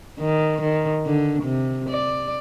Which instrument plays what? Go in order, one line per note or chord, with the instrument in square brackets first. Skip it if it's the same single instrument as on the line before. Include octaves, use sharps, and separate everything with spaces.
[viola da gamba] D#3
D#3
D3
C3
D5